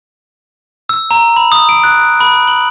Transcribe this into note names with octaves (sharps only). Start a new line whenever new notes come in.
E6
A#5
B5
D#6
D7
F#6
B5
F#7